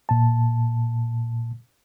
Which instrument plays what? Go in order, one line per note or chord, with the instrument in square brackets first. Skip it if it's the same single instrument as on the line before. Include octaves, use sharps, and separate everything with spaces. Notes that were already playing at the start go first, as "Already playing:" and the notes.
[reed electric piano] A#2 A5